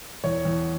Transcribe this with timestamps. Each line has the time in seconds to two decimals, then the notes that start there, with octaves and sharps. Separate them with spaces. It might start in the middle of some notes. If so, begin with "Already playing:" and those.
0.24 E2 C#5
0.45 E2